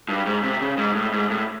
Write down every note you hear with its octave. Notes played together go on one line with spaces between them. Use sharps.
G2
G#2
C3
C#3
G#2
A2
G#2
A2